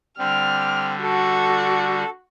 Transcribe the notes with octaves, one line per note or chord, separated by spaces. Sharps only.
D3 G3 C4 F6
F#4 A4